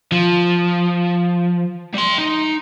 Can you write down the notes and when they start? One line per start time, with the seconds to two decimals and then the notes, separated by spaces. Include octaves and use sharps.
0.12 F3
1.94 G3 C6
2.19 D#4